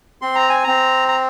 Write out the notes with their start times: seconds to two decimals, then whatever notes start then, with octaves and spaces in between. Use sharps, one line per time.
0.22 C4 C6
0.35 A#5
0.49 G#5
0.64 C4 A#5
1.08 A#5